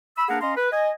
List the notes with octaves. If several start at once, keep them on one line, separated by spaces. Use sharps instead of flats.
B5 E6
A#3 D4 G#4 A#4 B4 F#5
C#4 D#5 F5 A#5 C6
B4
D#5 G#5